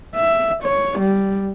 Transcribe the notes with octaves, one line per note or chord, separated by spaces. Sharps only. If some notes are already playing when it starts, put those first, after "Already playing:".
E5
C#5
G3